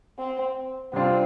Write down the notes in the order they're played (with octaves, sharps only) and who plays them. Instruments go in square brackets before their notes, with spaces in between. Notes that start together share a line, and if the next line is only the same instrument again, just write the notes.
[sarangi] C4
[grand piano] C3 G3 D4 F4 [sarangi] C4